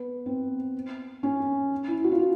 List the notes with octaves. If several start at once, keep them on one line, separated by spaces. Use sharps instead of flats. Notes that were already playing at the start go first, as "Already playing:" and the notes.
Already playing: B3
C4
C#4
E4
F#4
F4
E4